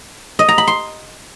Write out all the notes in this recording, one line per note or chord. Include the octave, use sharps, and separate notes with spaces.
D#5
A#5
B5
C6